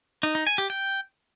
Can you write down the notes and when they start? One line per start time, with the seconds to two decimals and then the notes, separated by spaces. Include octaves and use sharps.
0.23 D#4
0.35 D#4
0.47 G#5
0.58 G4
0.70 G5